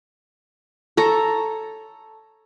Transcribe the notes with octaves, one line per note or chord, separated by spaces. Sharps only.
A4 C#5 A#5